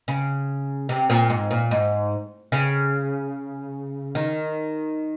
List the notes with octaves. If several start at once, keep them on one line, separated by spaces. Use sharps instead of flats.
C#3
C3
A#2
G#2
A#2
G#2
C#3
D#3